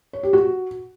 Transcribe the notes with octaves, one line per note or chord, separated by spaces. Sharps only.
C#5
G4
F#4